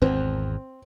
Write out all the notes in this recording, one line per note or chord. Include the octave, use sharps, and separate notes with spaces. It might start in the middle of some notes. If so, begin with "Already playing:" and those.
G#1 E2 C4